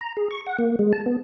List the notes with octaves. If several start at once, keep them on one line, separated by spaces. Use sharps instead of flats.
A#5
G#4
C#6
F#5
A#3
G#3
A5
B3